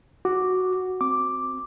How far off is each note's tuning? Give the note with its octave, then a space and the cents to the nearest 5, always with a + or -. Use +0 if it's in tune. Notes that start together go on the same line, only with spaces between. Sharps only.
F#4 +0 D6 +0
C4 +0 D6 +0